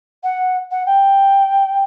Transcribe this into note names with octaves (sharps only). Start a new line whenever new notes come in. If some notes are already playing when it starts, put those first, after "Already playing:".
F#5
F#5
G5